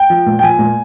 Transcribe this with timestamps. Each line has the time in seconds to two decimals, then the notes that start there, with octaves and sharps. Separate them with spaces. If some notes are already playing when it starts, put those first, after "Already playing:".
Already playing: G5
0.10 F3
0.26 A#2
0.39 G5
0.43 F3 G#5
0.59 A#2